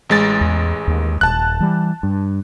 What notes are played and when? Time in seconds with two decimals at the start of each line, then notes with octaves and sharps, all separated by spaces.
0.10 A1 G#3 A6
0.41 E2
0.87 D#2
1.21 D#1 A5 F#6
1.60 E3 G3
2.03 G2